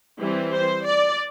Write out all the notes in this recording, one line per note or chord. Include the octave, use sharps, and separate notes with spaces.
E3 G3 C4
C5
D5